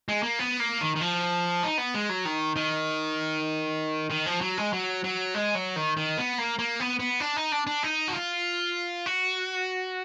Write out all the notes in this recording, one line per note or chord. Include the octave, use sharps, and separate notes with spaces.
G#3
A#3
B3
A#3
D#3
D#3
F3
D#4
B3
G#3
F#3
D#3
D#3
D#3
F3
F#3
G#3
F#3
F#3
G#3
F#3
D#3
D#3
B3
A#3
A#3
B3
B3
D4
D#4
D4
D4
D#4
F#4
F4
F#4